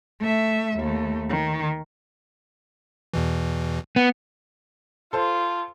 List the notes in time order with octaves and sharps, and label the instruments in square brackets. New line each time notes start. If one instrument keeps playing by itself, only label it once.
[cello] A3 E5
D#2 A3
D#3
[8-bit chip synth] E2 B2 E3
[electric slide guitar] B3
[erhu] F4 [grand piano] A4 C5